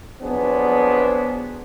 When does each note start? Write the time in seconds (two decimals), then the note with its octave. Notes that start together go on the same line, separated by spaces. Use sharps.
0.22 F2 F#3 B3 D4 G#4 C5